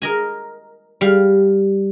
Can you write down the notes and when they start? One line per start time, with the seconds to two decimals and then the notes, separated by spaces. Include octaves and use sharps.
0.02 A#4 D#5 G#5
1.01 G3 F5